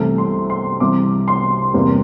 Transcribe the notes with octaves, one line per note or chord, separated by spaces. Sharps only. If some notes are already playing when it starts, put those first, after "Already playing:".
Already playing: C2 C3 E3 A3
C6
C6
C2 C3 E3 D6
C6
E2 C3 G3 A#3